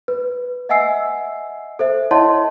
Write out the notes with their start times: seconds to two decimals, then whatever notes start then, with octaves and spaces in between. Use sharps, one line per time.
0.08 B4
0.69 D#5 E5 F#5 G#5 E6 C7
1.79 A4 C5 E5
2.11 E4 C#5 D#5 F#5 A5 C6